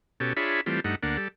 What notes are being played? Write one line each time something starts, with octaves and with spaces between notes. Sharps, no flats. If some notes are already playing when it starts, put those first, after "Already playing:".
B2 C#4 G4 A4
D4 F4 G#4 C#5 E5 B5
E3 G3 A3 C4 F4
G2 A3 D#4 F#5
D2 A#3 D4 F#5
G3 A4